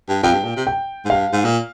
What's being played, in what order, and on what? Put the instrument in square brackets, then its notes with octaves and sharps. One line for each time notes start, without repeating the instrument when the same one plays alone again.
[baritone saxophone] G2
[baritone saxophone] F2 [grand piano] G5
[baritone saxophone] G2
A#2
C3
[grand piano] G5
[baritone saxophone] G#2
[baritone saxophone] G2 [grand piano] F5
[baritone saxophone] G#2
A#2